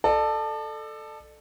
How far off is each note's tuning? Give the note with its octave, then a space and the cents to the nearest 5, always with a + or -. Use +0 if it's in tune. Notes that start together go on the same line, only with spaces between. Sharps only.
A4 +0 D5 +40